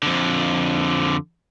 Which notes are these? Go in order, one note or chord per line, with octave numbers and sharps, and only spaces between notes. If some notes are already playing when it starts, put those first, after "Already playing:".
F2 D3